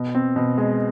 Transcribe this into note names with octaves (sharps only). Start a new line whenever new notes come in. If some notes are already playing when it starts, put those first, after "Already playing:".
Already playing: B2
C4
B2
G#3